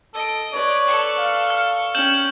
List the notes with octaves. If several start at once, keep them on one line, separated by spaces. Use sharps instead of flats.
A4 D#5 D7
B4 C#5 D5
A4 C#6
F5
F6
C#4 G5 G6 E7 F#7